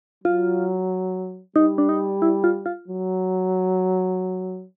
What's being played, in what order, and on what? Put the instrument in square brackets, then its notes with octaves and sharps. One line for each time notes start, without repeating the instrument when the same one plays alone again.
[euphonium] F#3 [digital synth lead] F4
[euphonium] G3 [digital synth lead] D#4
[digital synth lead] D4
D#4
E4
F4
F4
[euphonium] F#3